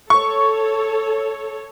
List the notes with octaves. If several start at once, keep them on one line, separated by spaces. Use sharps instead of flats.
A4 C#5 C#6